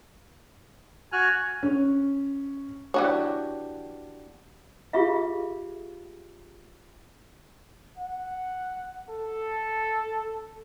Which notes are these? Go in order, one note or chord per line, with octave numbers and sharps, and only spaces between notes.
F#4 G#5 F6 F#6
C#4
E3 B3 D4 F#4 G4 C#5
F4 G4 G#4 E5 F5
F#5
A4